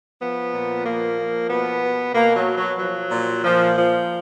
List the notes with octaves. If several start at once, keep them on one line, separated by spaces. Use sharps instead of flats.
F3 B3
A#2
F3 A#3
F3
B2 B3
B2
B2 A#3
F#3
B2
F#3
F3 F#3
A#2
A#2 F3
F3